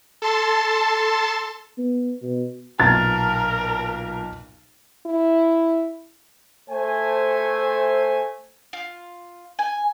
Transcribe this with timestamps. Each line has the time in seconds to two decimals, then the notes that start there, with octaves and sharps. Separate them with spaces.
0.22 A4 A5 C6 A6
1.78 B3
2.22 B2
2.80 B1 A#2 A#4 A6
5.06 E4
6.70 A3 C5 G#5
8.73 F4
9.59 G#5